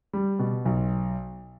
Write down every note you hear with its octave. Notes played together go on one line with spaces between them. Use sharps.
G3
B2
B1